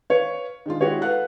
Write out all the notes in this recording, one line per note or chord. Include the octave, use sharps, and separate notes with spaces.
B4 C#5 F5
D#3 G#3 D4 F4
G#3 E4 F#4 G4 C#5
A4 B4 F5 F#5 F#6